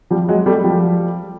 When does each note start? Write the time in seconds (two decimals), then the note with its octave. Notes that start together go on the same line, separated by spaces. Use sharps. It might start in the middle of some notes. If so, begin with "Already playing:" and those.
0.10 F3 G3
0.28 F#3 G#3
0.46 G3 A3
0.64 F3 G3